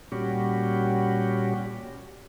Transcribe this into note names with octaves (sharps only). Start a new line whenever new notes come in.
A#2 G3 C#4 F#4 G4